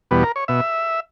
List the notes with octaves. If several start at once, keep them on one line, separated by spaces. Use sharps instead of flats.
E2 B2 G3 B3
A#4
C#5
B2 E5